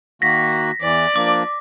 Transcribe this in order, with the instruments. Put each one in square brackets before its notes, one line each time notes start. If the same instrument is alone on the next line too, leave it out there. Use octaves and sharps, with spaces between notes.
[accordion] D#3 A#3 F#4 [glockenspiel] A#6 B6
[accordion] E2 E3 [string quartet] D5
[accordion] F3 A#3 D4 [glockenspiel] D6